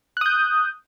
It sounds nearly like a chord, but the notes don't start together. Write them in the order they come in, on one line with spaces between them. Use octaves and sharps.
F#6 D#6 G6